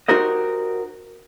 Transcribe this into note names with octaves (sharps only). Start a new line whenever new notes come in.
D#4 F#4 G4 A#4 C5 D#5